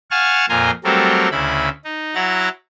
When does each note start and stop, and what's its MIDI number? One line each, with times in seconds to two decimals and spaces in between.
0.11 0.46 77
0.11 0.46 78
0.11 0.46 80
0.11 0.46 81
0.11 0.46 85
0.11 0.46 89
0.49 0.71 41
0.49 0.71 46
0.49 0.71 65
0.49 0.71 80
0.49 0.71 82
0.49 0.71 84
0.84 1.29 54
0.84 1.29 55
0.84 1.29 57
0.84 1.29 60
0.84 1.29 69
0.84 1.29 70
1.31 1.69 38
1.31 1.69 49
1.31 1.69 64
1.31 1.69 83
1.85 2.15 63
2.15 2.49 54
2.15 2.49 64
2.15 2.49 78
2.15 2.49 82
2.15 2.49 93